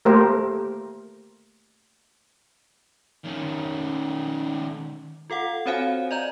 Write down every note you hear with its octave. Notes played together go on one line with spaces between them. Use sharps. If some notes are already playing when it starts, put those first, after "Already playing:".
A3 A#3 G4 A#4 C5
D#3 C#4
F4 A4 F5 F#5
C4 F#4 C5 C#5 F5 G#5
D5 D#5 A#5 G6